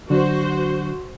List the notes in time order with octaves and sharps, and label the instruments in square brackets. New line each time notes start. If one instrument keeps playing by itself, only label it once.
[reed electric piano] D3 F#3 D4 [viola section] F#4 C5